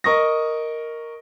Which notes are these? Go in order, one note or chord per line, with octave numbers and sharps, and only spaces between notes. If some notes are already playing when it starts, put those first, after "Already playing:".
A#4 D#5 C#6 D#6 A#6